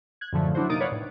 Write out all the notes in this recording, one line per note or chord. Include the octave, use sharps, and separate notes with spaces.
F#6 G#6
F#2 A2 D3 F3 A3
F#3 D4 E4 F#4 C5
C3 A#3 D#4 D#6 A6 D7
B4 C#5 D5 F5 F#5
A2